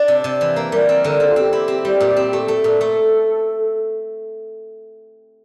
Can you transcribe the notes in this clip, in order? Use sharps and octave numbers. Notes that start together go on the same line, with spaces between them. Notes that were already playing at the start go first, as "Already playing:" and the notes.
Already playing: D4 D5
C3
C3
E3
A#3
G3 A#4
C4
D3
C4
F4
C4 G4
E4
C4
G3
A#2
C4
A3
A3
A#2 A4
A3